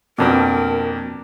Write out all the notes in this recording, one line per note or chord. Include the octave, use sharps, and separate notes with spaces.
F2 B2 A#3 C4 D4 A#4 A#5 D6